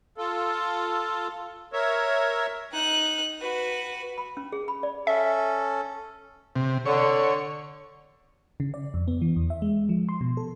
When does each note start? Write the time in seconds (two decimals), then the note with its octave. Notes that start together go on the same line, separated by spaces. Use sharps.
0.18 F4 A4
1.73 A#4 C#5 E5
2.72 D#4 F#6
3.41 F#4 B4
4.18 B5
4.37 C#4
4.52 G#4
4.68 B5
4.83 D5
5.07 C#4 A4 E5
6.56 C3
6.86 D3 C#5
8.60 C#3
8.74 D5
8.94 F2
9.08 B3
9.22 E3
9.36 E2
9.50 E5
9.62 G#3
9.89 F3
10.09 C6
10.21 B2
10.37 A4